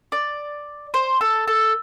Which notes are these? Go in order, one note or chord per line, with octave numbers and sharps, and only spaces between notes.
D5
C5
A4
A4